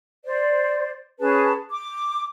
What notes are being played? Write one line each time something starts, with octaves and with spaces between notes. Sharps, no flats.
C5 D5
C#4 G#4 B4 A5
D6